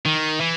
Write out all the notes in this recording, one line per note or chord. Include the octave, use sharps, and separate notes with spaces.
D#3
E3